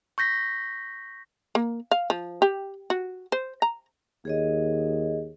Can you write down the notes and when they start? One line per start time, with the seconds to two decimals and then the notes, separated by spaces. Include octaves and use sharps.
0.18 C#6 G6 A#6 B6
1.55 A#3
1.91 F5
2.10 F3
2.42 G4
2.90 F#4
3.32 C5
3.62 A#5
4.25 D#2 G#4 C#5 D#5